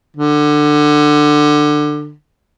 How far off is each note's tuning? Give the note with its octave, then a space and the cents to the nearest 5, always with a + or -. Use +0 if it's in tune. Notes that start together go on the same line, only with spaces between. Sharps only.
D3 +20